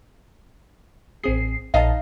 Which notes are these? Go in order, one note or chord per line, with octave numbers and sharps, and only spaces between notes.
A1 C4 G#4 C7
A#1 D#4 D#5 F5 A5